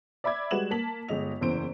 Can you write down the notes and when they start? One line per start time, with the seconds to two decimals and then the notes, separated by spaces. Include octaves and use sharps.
0.24 D5 E5 B5 D6 G#6
0.51 G3 G#3 F#4 B4 E7 F#7
0.71 A#3 A5 B6 F#7
1.08 G1 G#3 D#5 F7
1.41 F#1 E2 E3 C5 D7